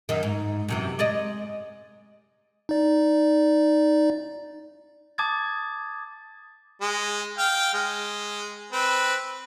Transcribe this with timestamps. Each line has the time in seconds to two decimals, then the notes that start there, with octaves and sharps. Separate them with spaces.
0.09 F#2 D#3
0.23 G#2
0.68 F#2 C3 E3
0.99 G#3 D5 D#5
2.69 D#4 D5
5.18 A5 D6 D#6 G#6 A6
6.81 G#3
7.38 F5 G5
7.74 G#3
8.72 C4 B4